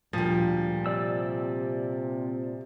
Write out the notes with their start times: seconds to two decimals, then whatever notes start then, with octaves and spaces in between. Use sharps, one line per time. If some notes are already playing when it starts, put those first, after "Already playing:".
0.13 D2 A#2 F3 G3
0.86 C3 D5 E6